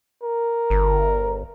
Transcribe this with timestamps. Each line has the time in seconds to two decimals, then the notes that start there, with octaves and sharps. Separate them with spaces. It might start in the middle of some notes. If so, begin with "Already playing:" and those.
0.23 A#4
0.70 G1